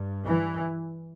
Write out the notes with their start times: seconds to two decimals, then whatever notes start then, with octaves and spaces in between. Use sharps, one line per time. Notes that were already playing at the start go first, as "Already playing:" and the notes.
Already playing: G2
0.26 E3